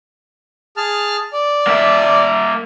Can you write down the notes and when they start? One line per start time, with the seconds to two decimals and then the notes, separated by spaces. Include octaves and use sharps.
0.77 G#4 A5 F6
1.33 D5
1.67 A#3 E5